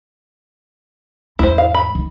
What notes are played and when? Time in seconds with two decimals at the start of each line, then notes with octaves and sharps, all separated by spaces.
1.39 E2 G#2 E4 C5
1.58 F5
1.74 B5
1.95 D#3